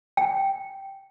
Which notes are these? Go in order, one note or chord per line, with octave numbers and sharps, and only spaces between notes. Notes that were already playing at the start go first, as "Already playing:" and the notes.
G5